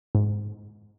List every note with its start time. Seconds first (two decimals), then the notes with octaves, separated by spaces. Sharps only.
0.15 G#2